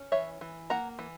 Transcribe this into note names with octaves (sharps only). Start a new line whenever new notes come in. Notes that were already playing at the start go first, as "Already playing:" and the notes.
Already playing: C#4
E3 C#5 E5
E3
A#3 F#5 A#5
E3